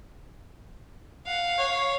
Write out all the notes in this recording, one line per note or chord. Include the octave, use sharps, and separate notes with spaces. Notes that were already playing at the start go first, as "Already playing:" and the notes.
F5 F#5
C#5